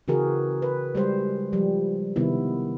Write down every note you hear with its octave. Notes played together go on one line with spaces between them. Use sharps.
C#3 E3 F#4 G#4 A#4
B4
G3 G#3 C5
F3 G3
C3 D#3 B3 E4